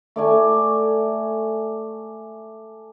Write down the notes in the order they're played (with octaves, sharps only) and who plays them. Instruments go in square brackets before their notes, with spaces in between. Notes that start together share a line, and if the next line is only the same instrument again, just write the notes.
[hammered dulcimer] A3 D5 G#5